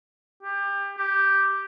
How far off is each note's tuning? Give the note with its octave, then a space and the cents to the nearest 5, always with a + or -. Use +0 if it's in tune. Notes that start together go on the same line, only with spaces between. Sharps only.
G4 +25
G4 -5